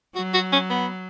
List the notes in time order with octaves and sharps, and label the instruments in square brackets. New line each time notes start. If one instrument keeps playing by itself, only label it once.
[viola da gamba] F#3 [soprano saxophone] F#4
[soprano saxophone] F#4
C#4
B3